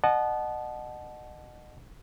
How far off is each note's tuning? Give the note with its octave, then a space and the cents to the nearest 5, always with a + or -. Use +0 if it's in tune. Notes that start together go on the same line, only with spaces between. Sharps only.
D#5 -30 F#5 +0 A5 -25